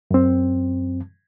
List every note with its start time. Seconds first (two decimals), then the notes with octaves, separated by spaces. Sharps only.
0.11 F#2 C4